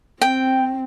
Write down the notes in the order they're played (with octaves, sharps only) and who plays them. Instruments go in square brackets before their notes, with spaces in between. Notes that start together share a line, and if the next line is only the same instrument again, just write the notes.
[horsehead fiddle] C4 [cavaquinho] G5